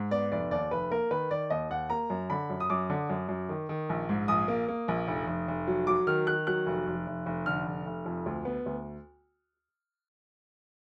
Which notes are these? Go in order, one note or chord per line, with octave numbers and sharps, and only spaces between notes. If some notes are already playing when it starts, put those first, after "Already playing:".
Already playing: G#2
B3 D5
F1 D5
D#2 D5
F1 B4
A#3 A#4
D#3 B4
D#3 D5
D#2 D#5
D#2 F#5
A#3 A#5
F#2
D3 B5
F#2
D#6
F#2 D6
D3
F#2
F#2
D#3
D#3
A#1
G#2
A#1 D#6
A#3
A#3
A#1
F1
F1
F1
F#3
F#3 D6
D#3 F6
D#3 F#6
F#3 F#6
F1
F1
F1
F1
D3 F6
F1
F1
F2
D2
B3
D2